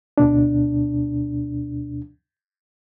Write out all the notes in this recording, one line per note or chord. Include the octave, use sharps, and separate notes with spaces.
D2 B2 D4